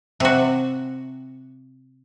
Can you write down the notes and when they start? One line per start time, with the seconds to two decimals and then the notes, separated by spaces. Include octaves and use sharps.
0.20 C3 F#4